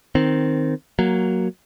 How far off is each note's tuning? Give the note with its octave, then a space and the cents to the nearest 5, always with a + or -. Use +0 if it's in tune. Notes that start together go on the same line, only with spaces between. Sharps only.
D#3 +0 C4 +0
F#3 +0 A#3 +0